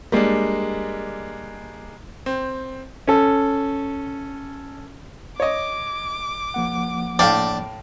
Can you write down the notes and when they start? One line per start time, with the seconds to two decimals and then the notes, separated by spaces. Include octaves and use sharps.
0.12 G3 G#3 A#3 D4
2.26 C4
3.08 C#4 A4
5.40 C#5 D#5 D6
6.54 F3 A#3 F#5
7.19 A2 D4 F5 G5